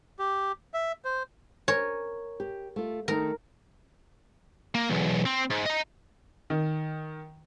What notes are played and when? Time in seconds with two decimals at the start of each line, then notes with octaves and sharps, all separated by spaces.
0.19 G4
0.74 E5
1.05 C5
1.68 A#4 C#5 G#5
2.40 G4
2.76 A3 F4
3.08 D#3 A3 D#4 A#4
4.75 A#3
4.90 B1 E2
5.26 C4
5.51 G#2
5.66 D#5 A#5
6.50 D#3